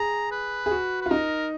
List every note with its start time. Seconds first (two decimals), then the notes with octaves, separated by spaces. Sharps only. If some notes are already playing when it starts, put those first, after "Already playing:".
Already playing: G#4 A#5
0.32 B4
0.66 G#4
0.71 F#4
1.01 B4
1.06 F4
1.11 D#4 A#4